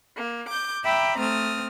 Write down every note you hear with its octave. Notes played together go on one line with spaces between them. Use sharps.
A#3
D6 G6
E5 G5 A#5 B5 D6
A3 C4 D#6 F6